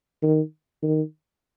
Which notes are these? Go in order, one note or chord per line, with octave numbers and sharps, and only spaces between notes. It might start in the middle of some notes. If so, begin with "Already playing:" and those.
D#3
D#3